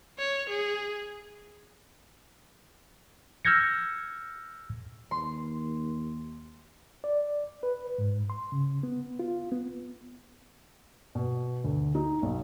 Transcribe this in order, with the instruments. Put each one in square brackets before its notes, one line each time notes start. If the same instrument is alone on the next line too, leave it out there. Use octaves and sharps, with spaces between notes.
[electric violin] C#5
G#4
[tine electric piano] E6 F6 G6 G#6 A#6 C#7
[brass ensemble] D#2 [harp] C6
[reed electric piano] D5
B4
G#2
C6
C#3
B3
F4
B3
[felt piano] B2
D2
D#4
B1